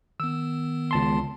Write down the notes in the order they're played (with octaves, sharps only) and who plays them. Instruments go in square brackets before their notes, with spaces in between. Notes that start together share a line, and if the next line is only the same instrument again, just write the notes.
[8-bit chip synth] D#3 B3 [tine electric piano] E6
[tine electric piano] C#2 A5 C6